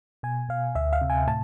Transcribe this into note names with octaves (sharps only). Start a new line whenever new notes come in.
B2 G#5
B2 F5
D2 E5
F5
C3
G#5
A2 A5